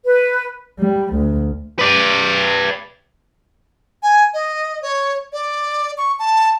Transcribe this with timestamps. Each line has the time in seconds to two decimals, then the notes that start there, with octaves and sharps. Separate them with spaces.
0.05 B4
0.79 G3
1.14 D2
1.79 B4 D5
4.03 G#5
4.34 D#5
4.82 C#5
5.33 D5
5.98 C#6
6.19 A5